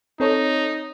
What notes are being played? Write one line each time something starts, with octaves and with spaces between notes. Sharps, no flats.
C4 D#4 A4 C#5